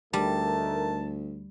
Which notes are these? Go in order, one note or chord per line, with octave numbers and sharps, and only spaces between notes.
D2 G3 A3 D#4 A#4 A5